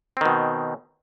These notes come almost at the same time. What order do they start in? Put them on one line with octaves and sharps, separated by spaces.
C4 D#3 B2